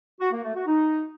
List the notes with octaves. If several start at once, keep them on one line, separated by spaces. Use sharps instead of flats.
F#4
A#3
A3
F#4
D#4